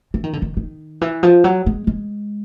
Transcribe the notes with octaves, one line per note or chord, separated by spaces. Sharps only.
E3
D#3
D3
D#3
D#3
E3
F3
F#3
G#3
G#3